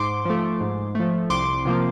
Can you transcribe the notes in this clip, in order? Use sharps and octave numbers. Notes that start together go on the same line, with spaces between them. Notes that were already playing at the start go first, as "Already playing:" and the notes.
Already playing: G#2 C6 D6
F3 A3
G#2
F3 A3
C2 C6 D6
C3 F3 A#3